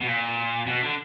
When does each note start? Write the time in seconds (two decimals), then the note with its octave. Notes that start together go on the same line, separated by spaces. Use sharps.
0.01 B2
0.07 A#2
0.67 B2
0.83 D3